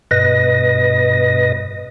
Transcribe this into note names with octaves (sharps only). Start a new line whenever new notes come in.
G2 B2 B4 D#5 A#6